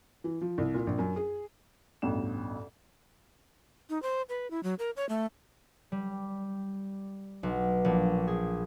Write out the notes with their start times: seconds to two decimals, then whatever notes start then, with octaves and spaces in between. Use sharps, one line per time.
0.24 E3
0.41 F3
0.58 C2
0.74 A#2
0.87 A#1
0.98 F#2
1.16 G#4
2.02 A1 D2 G2 B2 E7
3.90 D#4
4.02 C5
4.29 B4
4.51 E4
4.63 F#3
4.79 A#4
4.97 C#5
5.09 A3
5.92 G3
7.43 B1
7.85 A#1
8.28 G#4